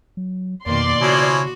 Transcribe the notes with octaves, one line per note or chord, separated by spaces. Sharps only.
F#3
F2 B2 D#3 A#3 D5 C6
C#3 F3 C#4 E4 F#4